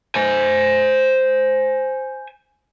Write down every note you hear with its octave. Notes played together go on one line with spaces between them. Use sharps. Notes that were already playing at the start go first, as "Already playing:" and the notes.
C5 G#5